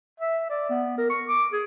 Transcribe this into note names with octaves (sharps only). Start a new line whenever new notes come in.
E5
D5
B3
A#4
C#6
D6
G#4